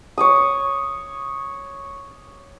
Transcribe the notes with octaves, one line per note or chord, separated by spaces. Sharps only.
C#5 D6 D#6